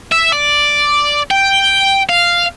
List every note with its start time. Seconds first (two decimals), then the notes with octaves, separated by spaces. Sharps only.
0.12 E5
0.33 D5
1.31 G5
2.09 F5